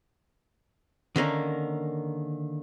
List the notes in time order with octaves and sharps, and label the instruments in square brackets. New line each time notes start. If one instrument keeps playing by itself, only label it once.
[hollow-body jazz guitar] D3 D#3 A#3 C#4